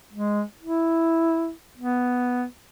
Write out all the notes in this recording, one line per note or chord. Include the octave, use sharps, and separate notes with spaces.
G#3
E4
B3